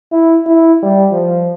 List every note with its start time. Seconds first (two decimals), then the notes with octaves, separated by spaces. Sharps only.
0.12 E4
0.46 E4
0.83 G3
1.12 F3